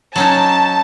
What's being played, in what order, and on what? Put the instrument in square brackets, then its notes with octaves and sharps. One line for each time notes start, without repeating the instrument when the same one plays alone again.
[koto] F#3 C#4 D#4 [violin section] A5